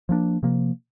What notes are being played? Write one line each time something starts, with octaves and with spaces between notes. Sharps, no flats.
F3 A#3 D4
C3 F3 A#3